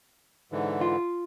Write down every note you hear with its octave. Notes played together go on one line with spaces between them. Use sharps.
G#2 D3 E3
F4